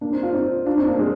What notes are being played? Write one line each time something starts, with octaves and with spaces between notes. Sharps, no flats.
A#3 D4
C4 D#4
D4 F4
C4 D#4
D4 F4
C4 D#4
A#3 D4
G#3 C4